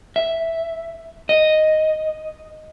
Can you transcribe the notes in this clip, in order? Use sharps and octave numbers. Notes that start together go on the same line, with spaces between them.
E5
D#5